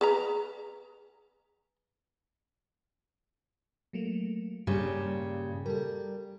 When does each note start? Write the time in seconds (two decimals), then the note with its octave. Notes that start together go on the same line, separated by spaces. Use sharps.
0.01 G#4 B4 A#5
3.93 F#3 A3 A#3
4.67 G2 A#2 C#3 G3
5.66 G3 A4 A#4